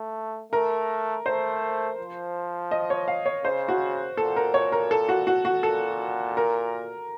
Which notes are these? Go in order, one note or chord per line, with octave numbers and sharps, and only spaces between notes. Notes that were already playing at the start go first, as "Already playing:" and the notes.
Already playing: A3
A3 A#4
A3 C5
F3
D#5
C#5
F5
C#5
C#3 C5
F#4
A#2 A4
A#4
C#5
A#4
A4
F#4
F#4
F#4
A#2 A4
A#4